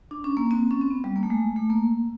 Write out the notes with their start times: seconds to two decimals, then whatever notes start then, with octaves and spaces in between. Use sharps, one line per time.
0.11 D4
0.24 C#4
0.37 A#3
0.51 C4
0.71 C#4
0.81 C4
0.91 B3
1.04 G3
1.16 A#3
1.23 A3
1.30 G#3
1.56 A3
1.70 A#3